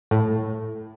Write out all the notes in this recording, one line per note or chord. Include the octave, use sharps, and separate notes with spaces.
A2